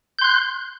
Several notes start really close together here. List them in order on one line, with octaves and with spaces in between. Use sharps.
G6 C6 F#6